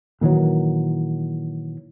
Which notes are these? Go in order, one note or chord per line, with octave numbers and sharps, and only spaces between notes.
A#2 D#3 E3 F#3